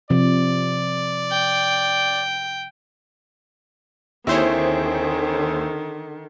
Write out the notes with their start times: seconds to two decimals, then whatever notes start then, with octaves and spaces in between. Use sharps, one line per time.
0.10 C3 F3 D5
1.32 G5
4.27 D#2 D3 D#3 C4 E4 G#4 C5 C#5